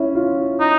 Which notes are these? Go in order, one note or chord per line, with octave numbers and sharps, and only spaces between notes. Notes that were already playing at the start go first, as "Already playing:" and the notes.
Already playing: C#4 E4
F4
D#4